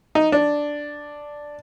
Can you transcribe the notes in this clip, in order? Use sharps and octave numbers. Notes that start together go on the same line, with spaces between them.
D#4
D4